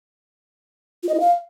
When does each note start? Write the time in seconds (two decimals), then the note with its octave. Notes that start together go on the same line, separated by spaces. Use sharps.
1.03 F4
1.09 D#5
1.14 E4
1.20 F5